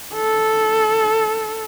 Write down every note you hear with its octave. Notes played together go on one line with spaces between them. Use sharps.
A4